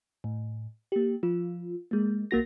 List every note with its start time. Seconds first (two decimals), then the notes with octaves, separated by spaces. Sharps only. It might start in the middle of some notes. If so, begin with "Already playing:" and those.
0.24 A2
0.92 A#3 G4
1.23 F3 F4
1.91 G#3 A#3
2.31 B1 A#3 F#4 A#6